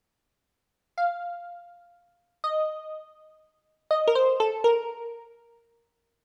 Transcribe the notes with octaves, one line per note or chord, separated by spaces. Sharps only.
F5
D#5
D#5
A#4
C5
A4
A#4